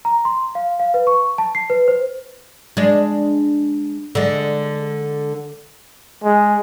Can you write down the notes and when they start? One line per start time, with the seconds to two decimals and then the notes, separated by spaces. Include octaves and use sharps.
0.05 A#5
0.25 C6
0.55 F5
0.80 F5
0.94 B4
1.07 C#6
1.38 A5
1.55 C7
1.70 B4
1.88 C5
2.77 G#3 D4
4.15 D3 G#3
6.24 G#3